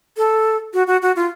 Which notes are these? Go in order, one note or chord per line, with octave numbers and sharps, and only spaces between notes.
A4
F#4
F#4
F#4
F4